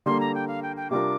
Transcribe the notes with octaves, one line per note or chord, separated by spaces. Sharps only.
D3 G3 A#3 C6
A#5
G5
F5
G5
G5
C3 G3 D4 F4 A#4 D6